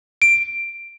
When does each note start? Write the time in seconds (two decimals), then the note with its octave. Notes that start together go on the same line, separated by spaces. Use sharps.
0.22 D7